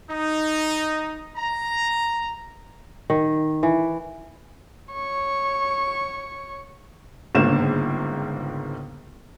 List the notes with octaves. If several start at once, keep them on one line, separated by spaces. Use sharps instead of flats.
D#4
A#5
D#3
E3
C#5 C#6
G1 C#2 G#2 D3 A#3 E7